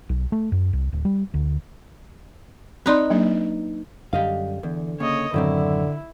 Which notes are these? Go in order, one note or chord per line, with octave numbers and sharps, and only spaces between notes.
B1
A3
F#2
C2
D1
G3
D2
C4 D#4 B4 D5 C6
F#3 A#3 D4
F#2 D3 G3 G4 D#5 F5
E2 D3
C#3 A#3 C#5 D#5
F#2 A2 D3 D#3 F#3 C4 E4